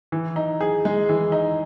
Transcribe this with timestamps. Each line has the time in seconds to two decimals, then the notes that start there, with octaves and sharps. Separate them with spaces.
0.12 E3
0.36 D#4
0.61 G#4
0.85 G#3
1.09 E3
1.32 D#4